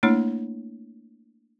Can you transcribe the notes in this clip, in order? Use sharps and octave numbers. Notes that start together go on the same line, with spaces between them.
A3 A#3 D4 E4 C#5